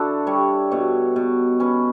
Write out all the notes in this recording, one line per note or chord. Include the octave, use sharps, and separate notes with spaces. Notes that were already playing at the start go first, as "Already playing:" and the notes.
Already playing: D3 D4 E4 F#4 A4
G3 C#5
B2 C#5
B2
C#4 B4